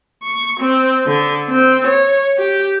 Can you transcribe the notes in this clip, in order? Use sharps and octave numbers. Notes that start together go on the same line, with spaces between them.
C#6
C4
D3
C4
C#5
G4